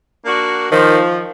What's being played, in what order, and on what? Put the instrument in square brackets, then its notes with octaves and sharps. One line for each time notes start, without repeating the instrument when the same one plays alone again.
[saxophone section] A#3 D4 F#4
[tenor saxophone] D#3 [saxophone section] F3